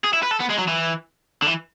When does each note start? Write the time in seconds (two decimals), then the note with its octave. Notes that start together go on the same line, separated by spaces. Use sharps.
0.04 G#4
0.13 E4
0.23 B4
0.31 A4
0.40 B3
0.49 G#3
0.58 F#3
0.68 E3
1.42 D3
1.47 E3